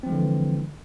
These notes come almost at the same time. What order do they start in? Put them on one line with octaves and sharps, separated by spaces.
C4 F3 G#3 D3 E3